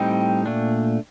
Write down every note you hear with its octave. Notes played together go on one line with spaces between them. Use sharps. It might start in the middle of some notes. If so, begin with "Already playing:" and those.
Already playing: A2 G3 C4 D#4 G5
A#2 A3 D4